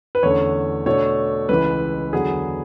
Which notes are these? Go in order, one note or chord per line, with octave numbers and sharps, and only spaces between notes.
B4
E2 D3 A3 C#4 C#5
B2 A3 D4 C#5
C#2 C#3 E3 G#3 B4
E2 D3 F#3 B3 G#4